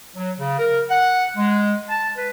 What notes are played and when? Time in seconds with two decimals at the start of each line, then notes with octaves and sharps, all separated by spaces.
0.15 F#3
0.39 C#3
0.59 A#4
0.89 F#5
1.36 G#3
1.89 A5
2.17 B4